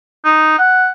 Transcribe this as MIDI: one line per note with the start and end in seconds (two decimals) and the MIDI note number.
0.25 0.58 63
0.59 0.90 78